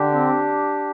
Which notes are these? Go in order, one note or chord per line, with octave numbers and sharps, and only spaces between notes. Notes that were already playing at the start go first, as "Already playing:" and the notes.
Already playing: D3 D4 G4
C4